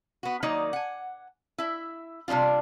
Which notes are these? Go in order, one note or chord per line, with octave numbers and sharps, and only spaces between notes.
B3 F#4
D#3 F#3 A#3 D#4 D5
F#5 G#5
E4 E5
C3 G3 C4 D4 F4